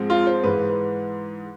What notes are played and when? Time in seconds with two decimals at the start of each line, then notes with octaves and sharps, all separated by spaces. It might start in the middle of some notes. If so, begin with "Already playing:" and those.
Already playing: G#2 F3 G#3 C4
0.10 F4
0.27 C5
0.43 G#2 E3 G#3 B4
0.69 B4